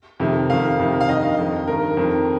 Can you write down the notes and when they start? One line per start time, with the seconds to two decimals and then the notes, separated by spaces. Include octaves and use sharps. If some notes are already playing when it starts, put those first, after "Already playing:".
0.20 F2 C3 D#3
0.50 F2 D#3 F5
0.79 F2 C3 D#3
1.01 F5
1.09 G2 D#3 D#5
1.38 F2 D#3
1.68 G2 D#3 A#4
1.97 F2 D#3